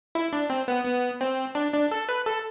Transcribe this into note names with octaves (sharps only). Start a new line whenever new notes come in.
E4
D4
C4
B3
B3
C4
D4
D4
A4
B4
A4